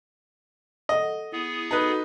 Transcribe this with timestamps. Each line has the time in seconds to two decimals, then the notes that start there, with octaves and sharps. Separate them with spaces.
0.89 A4 D#5 F#5
1.32 B3 E4 G#4
1.71 D#4 F#4 A4 B4